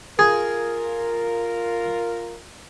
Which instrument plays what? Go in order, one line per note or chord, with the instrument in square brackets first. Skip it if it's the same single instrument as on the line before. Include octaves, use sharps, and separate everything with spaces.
[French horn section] F4 A#4 [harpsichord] G#4